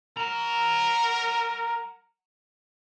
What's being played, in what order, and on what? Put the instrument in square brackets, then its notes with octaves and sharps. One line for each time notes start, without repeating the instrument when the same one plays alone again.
[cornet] A#4 [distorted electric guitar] F#5 A#5